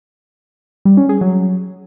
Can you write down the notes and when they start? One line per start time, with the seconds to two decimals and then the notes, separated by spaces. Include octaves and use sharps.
0.85 G3
0.97 C#4
1.09 G#4
1.21 F#3